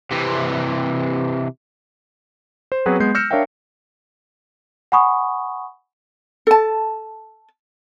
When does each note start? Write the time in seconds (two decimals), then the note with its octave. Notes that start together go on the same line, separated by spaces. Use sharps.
0.11 C3 E3
2.72 C5
2.86 F#3 B3 C4 F#4 G#4 B4
3.00 G#3 B3 G6 C7
3.15 E6 F6 G6 A#6 C#7 E7
3.31 D4 A#4 C#5 E5 F5 G5
4.92 F#5 G#5 B5 C#6 D#6
6.47 A4 A5